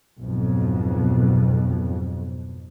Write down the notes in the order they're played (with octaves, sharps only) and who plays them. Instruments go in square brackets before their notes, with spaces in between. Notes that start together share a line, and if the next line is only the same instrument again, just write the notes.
[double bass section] B1 F2 G#2